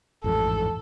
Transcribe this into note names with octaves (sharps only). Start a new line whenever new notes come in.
A1 F2 G#2 A4